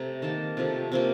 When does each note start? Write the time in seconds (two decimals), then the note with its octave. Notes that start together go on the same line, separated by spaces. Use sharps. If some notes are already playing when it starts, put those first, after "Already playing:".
Already playing: C3 A3 A#5
0.22 D#3 A#3 A5
0.57 C3 F3 A3
0.92 C3 F3 A#3